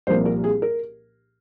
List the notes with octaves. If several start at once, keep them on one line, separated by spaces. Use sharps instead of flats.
C2 A#2 F3 A#3 C5
A#4
G#4
A#4